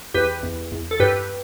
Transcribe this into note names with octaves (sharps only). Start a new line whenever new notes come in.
E2 G4 B4
E2
E2
A4
G2 G4 B4